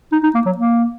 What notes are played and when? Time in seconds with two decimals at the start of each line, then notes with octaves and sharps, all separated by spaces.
0.12 D#4
0.23 D#4
0.34 A#3
0.46 F#3
0.58 A#3